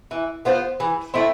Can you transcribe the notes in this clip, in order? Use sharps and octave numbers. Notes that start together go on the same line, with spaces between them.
E3
B3 F4 C5
E3
A3 C4 E4